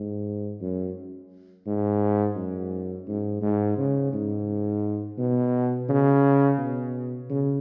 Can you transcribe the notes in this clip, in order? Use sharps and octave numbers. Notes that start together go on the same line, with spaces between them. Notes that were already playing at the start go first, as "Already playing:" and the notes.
Already playing: G#2
F#2
G#2
F#2
G#2
G#2
C#3
G#2
B2
C#3
B2
C#3